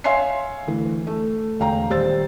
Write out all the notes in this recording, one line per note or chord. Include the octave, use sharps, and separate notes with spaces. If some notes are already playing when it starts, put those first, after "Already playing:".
C#5 E5 F5 G#5 C6 C7
D2 E3
A3
E1 D2 F5 G5 A#5
D#1 G3 C5 E6 A6